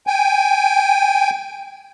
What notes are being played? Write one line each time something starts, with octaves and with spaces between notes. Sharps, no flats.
G5 G#5